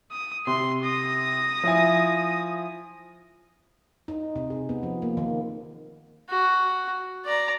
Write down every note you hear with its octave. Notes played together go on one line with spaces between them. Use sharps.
D#6
C3 C6
D#6 A#6
F3 E4 G#5
D#4
C3
G#4
B3
F3
A#3
D#3
F#4
D5 A#5